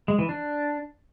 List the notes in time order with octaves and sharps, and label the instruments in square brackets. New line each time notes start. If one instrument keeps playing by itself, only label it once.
[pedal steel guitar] G#3
E3
D4